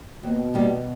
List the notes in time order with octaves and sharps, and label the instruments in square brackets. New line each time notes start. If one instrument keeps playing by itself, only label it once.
[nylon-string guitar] D#2 [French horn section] B2
[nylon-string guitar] D#3 G3 A#3 D#4